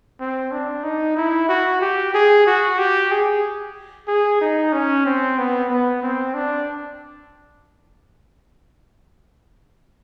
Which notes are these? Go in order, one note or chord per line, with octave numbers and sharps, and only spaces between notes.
C4
D4
D#4
E4
F#4
G4
G#4
F#4
G4
G#4
G#4
D#4
C#4
C4
B3
B3
C4
D4